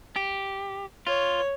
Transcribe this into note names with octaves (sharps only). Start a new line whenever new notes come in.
G4
F4 C#5